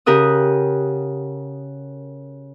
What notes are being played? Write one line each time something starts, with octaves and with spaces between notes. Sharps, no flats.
C#3 G4 A#4 F#5 D#6